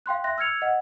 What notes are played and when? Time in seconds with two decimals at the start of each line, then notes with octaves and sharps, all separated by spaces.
0.06 F5 G5 C6 F#6
0.24 E5 C6 F#6 A#6
0.38 E6 F6 G#6 C#7 F7
0.62 D#5 F#5